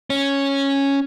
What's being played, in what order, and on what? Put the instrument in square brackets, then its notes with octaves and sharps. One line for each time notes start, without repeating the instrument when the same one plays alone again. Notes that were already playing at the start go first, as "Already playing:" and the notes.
[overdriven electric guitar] C#4